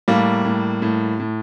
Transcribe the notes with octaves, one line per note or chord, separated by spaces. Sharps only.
A2 G3 A#3
A2
A2
A2